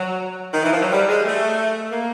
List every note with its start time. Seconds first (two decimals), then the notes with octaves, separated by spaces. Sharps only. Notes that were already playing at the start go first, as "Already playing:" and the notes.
Already playing: F#3
0.53 D#3
0.63 E3
0.72 F3
0.82 F#3
0.92 G3
1.09 G#3
1.25 A3
1.92 A#3